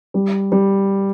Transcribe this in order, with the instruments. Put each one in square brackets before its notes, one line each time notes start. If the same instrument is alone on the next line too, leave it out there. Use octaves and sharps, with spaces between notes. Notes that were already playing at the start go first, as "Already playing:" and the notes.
[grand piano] G3
G3